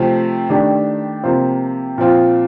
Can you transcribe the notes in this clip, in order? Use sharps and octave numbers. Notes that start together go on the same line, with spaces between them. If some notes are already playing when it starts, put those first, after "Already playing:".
Already playing: C3 F3 A3 C4
D#3 A3 D4 G4
C3 F3 A#3 F4 C5
A#2 F3 C4 F4